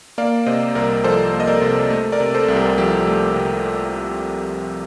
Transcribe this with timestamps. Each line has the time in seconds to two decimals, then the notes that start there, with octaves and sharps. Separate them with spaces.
0.18 A#3 D5 F5
0.46 C3 C5 D#5
0.75 C2 A#4 D5
1.04 F3 A4 C5
1.33 A#3
1.40 D#5
1.47 A#4 D5
1.62 C3
1.90 A3
2.12 A#4 D5
2.20 C3
2.34 A4 C5
2.48 C2
2.56 G4 A#4
2.78 F3 G4
3.07 A3
3.35 C3